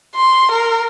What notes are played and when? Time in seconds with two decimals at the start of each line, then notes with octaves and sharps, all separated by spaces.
0.15 C6
0.51 A#4